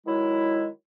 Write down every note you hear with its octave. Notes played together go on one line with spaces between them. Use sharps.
D#3 F#3 G#3 E4